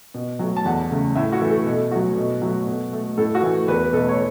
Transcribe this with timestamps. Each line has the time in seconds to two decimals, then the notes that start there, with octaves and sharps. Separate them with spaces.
0.14 B2
0.39 F#3 A3
0.56 A5
0.65 E2 F#5
0.91 C#3 A3
1.15 A2 E5
1.32 F#4
1.41 E3 A3
1.49 A4
1.66 B2
1.91 F#3 A3 F#4
2.17 B2
2.42 F#3 A3
2.67 B2
2.93 A3
3.18 A2 A4
3.35 F#4
3.42 E3 A3
3.68 E2 B4
3.93 B2 A3 A4
4.09 C#5